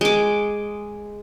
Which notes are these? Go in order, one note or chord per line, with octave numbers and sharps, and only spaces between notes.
G#3 D6